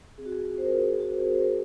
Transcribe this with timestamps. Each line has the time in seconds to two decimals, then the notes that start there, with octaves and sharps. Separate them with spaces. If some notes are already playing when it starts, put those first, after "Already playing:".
0.18 C4 G#4
0.26 F#4
0.32 G#4
0.45 F4 G#4
0.58 C5
0.65 A#4
0.72 F4 G#4
0.91 G#4
1.00 F4 F#4
1.20 G#4
1.27 C4
1.35 C5
1.41 A#4